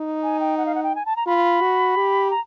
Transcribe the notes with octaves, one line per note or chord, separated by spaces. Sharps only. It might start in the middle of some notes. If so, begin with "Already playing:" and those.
Already playing: D#4
G#5
G5
F#5
F5
F#5
G5
G#5
A5
A#5
F4 B5
F#4
G4
A#5